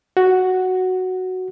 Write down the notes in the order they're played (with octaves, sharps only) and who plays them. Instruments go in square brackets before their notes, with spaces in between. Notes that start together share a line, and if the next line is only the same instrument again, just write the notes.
[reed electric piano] F#4